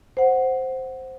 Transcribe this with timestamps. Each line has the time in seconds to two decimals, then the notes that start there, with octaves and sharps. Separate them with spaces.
0.17 C5 F#5